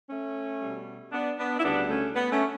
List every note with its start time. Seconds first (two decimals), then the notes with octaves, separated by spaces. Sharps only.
0.10 A3 C#4
0.62 B2 G3
1.12 B3 D4
1.38 B3 D4
1.59 E4
1.63 D2 C#3 G3 B3 D4
1.89 A3 C#4
2.15 B3
2.32 A3 C#4